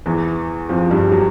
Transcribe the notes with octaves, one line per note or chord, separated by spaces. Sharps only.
E2 E3
F2 F3
G2 G3
F#3